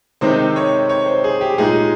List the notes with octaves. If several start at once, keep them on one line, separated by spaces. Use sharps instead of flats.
C3 D#3 G#3 C4 D#4 C5
C#5
C#5
C5
G#4
G4
A#2 G#3 D#4 G#4